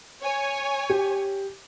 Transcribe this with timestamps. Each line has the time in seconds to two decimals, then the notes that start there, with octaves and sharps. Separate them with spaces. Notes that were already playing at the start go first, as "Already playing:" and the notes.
0.23 C#5 G#5
0.90 G4